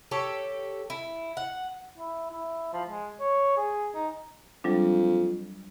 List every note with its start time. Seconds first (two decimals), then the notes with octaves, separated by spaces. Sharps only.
0.11 G4 A4 C#5
0.90 E4
1.37 F#5
1.98 E4
2.31 E4
2.73 F3
2.88 G#3
3.20 C#5
3.57 G#4
3.95 D#4
4.64 F2 F#3 G3 D4